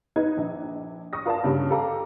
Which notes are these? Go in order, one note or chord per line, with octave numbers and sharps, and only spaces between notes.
D#4 B4 G#6
A#1
C#6 D#6 A#6
F4 A#4 D5 F5 A5
G2 C#3
G4 A4 F5 A#5 D6